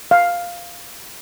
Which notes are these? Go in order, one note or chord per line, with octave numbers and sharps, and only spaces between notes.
F5